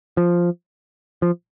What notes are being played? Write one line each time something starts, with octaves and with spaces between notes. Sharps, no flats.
F3
F3